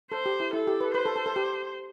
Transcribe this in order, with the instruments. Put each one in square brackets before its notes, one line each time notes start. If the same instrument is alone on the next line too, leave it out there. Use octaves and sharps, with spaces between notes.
[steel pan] A4 [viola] C5
[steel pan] G4
E4
[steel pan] E4 [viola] A4
[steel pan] G4
B4
[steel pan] B4 [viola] C5
[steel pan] A4
A4
A4
G4